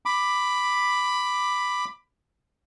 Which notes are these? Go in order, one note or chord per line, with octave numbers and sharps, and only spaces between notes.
B5 D6